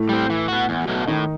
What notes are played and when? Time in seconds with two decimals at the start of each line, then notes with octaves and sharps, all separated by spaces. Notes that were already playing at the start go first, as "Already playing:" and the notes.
Already playing: A2 A3
0.09 G3 C4
0.30 E3
0.48 B3 F#4
0.69 E2
0.88 B2 F#3 A3
1.07 A2 D#3 D#4